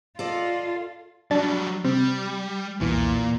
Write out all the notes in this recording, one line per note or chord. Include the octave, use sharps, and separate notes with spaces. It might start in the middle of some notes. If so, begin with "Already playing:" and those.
F4 A4 D5 D#5
F#3 G3 D4 A6
C3 G3
B1 E2 A#2 E3